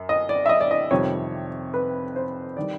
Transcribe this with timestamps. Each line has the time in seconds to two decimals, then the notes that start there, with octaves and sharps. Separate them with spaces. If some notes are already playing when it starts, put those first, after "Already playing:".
Already playing: F#2
0.09 D#5
0.29 D5
0.46 E5
0.49 D#5
0.61 D5
0.71 D#5
0.91 F2 C3 D#3 G3 C#5
1.74 B4
2.16 C5
2.57 D#3 G3 D5